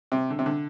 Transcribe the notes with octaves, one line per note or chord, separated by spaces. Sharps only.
C3
D3
C3
D3